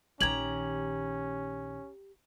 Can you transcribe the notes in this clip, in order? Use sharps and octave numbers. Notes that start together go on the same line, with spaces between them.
A#1 D#3 C#4 G4 A#5 G#6 F#7